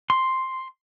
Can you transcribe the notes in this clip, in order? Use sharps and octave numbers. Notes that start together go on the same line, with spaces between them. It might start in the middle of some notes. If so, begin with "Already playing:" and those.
C6